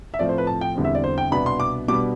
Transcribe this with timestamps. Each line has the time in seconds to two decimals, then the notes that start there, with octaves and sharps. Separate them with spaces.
0.14 E5
0.19 A2 F3 A3 C4 D5
0.29 C5
0.38 B4
0.47 A5
0.61 G5
0.76 E2 D3 G3 C4
0.85 E5
0.95 D5
1.04 C5
1.18 G5
1.32 C2 B2 B3 D4 B5
1.46 C6
1.60 D6
1.88 B2 G3 B3 D4 D6